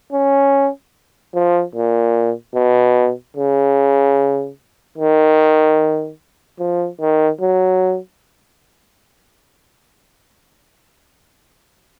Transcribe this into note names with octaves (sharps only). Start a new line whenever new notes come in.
C#4
F3
A#2
B2
C#3
D#3
F3
D#3
F#3